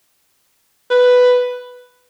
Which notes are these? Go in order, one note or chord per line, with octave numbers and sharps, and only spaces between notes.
B4